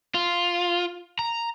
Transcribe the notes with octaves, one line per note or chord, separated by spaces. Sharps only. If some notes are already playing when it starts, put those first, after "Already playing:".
F4
A#5